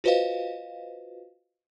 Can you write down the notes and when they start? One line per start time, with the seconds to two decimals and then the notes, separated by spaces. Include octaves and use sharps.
0.04 F4 F#4 B4 C5 D#5 F5